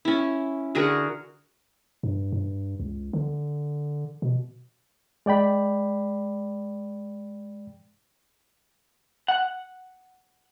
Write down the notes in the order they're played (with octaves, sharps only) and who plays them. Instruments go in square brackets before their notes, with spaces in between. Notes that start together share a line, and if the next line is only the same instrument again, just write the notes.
[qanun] C#4 E4
D3 F#4 G#4 A#4
[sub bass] G2
G2
C#2
D3
B2
[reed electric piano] G#3 D5 G5 B5
[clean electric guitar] F#5